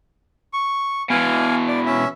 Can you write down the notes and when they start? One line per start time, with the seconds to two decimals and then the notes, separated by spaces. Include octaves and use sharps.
0.53 C#6
1.10 B2 E3 F5 G#5
1.68 D5
1.86 C#4 E5